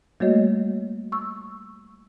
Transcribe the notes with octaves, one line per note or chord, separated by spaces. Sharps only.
G3 A3 A#3 F#4 C#5 D#5
C#6 E6